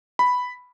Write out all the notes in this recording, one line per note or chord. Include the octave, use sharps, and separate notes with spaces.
B5